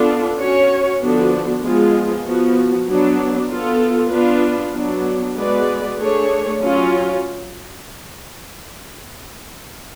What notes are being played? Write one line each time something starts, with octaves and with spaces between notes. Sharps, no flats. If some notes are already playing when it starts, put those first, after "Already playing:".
Already playing: B3 D4 F4 A4
C#4 F#4 C#5
D3 F3 B3 D4 F#4
F3 G#3 B3 F4 G#4
F3 B3 F#4
F#3 B3 D4
B3 F4 A4
B3 D4 F4 B4
F#3 B3 D4
G#3 B3 F#4 B4 D5
A3 D4 G#4 C#5
F#3 C#4 F4